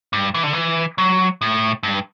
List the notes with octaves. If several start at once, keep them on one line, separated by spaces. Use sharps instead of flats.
G2
E3
D3
E3
F#3
A2
G2